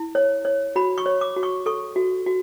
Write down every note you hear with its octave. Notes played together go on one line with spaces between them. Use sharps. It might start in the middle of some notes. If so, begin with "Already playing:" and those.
Already playing: E4
C#5
C#5
F#4 B5
C#6
C#5
D6
F#4
C#6
A4 C#6
F#4
F#4